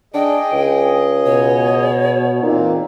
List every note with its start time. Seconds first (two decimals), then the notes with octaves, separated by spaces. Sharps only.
0.14 D4 G#4 D#5 G5
0.52 C#2
1.26 B2 C#5
2.43 E2 A#2 A#3 C4 D#4